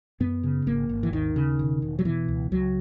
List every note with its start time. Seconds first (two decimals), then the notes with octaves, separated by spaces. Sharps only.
0.20 F#2 B3
0.43 C#3
0.66 G#1 A#3
0.89 G#1
1.03 E3
1.13 D#2 D#3
1.36 C#3
1.59 E1
1.82 E1
1.99 F#3
2.05 B2 E3
2.28 C#2
2.51 C#2 F#3